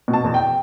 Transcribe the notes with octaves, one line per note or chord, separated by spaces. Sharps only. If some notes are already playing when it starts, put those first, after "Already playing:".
B2
A5
E2
G5